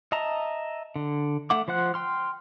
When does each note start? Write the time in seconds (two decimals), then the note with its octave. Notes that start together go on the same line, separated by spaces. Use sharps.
0.12 D#5 E5 A5 A#5
0.96 D3
1.50 A3 F#5 D6
1.68 F3 C5 F#5 F#6
1.94 G5 C6 F6